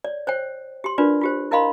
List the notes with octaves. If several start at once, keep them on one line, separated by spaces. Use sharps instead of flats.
C#5 D5
C5 C#5 G5
G4 C6
D4 F4 A#4 B4 D5
F4 G4 C5
E4 A#4 D#5 F5 B5 C6